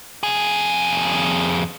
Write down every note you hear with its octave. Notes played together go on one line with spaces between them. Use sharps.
F2 G#4